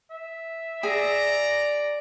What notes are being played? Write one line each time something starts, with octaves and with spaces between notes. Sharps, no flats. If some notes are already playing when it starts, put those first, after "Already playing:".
E5
G#4 D5 A#5